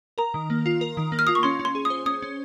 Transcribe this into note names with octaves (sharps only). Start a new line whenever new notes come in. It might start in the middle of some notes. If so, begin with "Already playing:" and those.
A#4 A#5
D#3
A#3
F4
A#4
D#3
A#3
F6
F4 D#6
C#6
C#4 C6
C#4
C6
G#4
D#6
C5
C#4 D#6
C#4